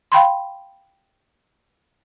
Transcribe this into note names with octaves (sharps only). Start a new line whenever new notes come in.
F5 G5 B5 C6